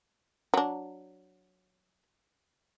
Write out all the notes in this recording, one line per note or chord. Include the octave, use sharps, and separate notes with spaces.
F#3 D4